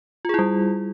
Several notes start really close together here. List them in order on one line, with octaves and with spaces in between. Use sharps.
F4 G#4 E4 G3